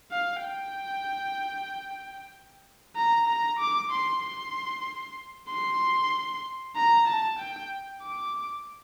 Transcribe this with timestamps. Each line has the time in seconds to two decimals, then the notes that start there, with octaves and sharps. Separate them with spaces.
0.12 F5
0.43 G5
2.96 A#5
3.28 A#5
3.59 D6
3.91 C6
4.23 C6
5.50 C6
6.76 A#5
7.08 A5
7.39 G5
8.03 D6